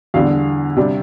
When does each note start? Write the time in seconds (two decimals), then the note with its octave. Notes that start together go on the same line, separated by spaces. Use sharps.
0.14 E2 D3 G3 F5
0.76 C3 G3 D4